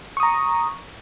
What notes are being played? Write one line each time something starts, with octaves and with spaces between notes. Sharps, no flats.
A#5 C#6 D#6